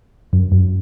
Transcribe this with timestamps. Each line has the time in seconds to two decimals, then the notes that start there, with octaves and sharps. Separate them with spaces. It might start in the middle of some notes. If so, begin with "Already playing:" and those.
0.33 F#2
0.52 F#2